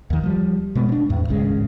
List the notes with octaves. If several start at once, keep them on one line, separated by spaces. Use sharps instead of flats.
D#2 D#3
F3 G3
B2 G#3 B3
B3 D4
E2 A2
D1 G#1 C#3 G#3